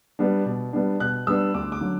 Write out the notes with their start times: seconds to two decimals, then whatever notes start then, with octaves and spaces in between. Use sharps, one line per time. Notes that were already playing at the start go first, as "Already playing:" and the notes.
0.19 G3 B3 D4
0.46 B2
0.73 G3 B3 D4
1.00 B2 F#6
1.27 G3 B3 D4 E6
1.54 D2 D6
1.72 D6
1.81 D3 F#3